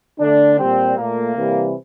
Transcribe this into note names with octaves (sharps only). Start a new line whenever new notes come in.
D3 A3 D4
A#2 G3 C4
A#2 A3 A#3
C3 E3 G3